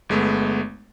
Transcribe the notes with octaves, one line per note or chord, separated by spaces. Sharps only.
G1 G#3 A3 B3